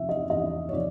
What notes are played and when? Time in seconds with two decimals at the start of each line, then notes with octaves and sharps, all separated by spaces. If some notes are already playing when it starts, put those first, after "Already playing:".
Already playing: E2 C3 F3 E5
0.09 D#5
0.30 E2 D#5
0.69 C#5
0.73 C3 F3 D5